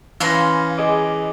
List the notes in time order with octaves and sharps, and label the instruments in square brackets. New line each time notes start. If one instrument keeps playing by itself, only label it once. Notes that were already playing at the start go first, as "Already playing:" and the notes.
[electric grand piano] E3 C#4 A#6 [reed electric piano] F5 [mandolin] B5 C6 F6
[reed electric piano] G#4 D#5 D6